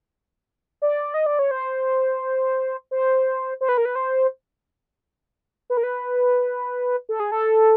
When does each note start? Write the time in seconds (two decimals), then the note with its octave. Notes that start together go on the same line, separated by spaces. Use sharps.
0.82 D5
1.14 D#5
1.26 D5
1.39 C#5
1.51 C5
2.91 C5
3.61 C5
3.69 B4
3.77 A#4
3.85 B4
3.95 C5
5.70 B4
5.77 A#4
5.83 B4
7.09 A4
7.20 G#4
7.32 A4